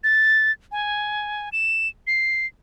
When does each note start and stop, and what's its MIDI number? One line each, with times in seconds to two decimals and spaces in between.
0.04 0.52 93
0.72 1.49 80
1.52 1.88 100
2.07 2.46 96